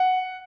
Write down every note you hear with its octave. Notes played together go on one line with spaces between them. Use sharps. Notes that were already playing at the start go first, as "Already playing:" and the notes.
Already playing: F#5